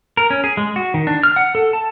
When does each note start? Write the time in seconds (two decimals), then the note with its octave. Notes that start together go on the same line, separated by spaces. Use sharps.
0.17 A#4
0.30 C#4
0.44 G#4
0.57 G#3
0.76 F#4
0.94 D#3
1.07 D4
1.23 F6
1.36 F#5
1.55 A4
1.73 A5